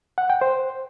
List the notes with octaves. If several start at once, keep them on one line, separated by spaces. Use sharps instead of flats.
F#5
G5
C5